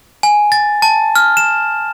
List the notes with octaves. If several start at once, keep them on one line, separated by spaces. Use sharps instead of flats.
G#5
A6
A5
F6
E7